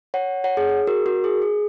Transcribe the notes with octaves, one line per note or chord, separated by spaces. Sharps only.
C#5 F#5
C#5 F#5
G#4
G#4
F#4 A#4
F#4 A#4
G#4
G#4